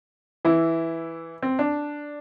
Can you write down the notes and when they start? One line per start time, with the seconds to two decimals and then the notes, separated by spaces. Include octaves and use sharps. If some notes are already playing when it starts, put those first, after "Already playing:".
0.45 E3 E4
1.43 C4
1.59 D4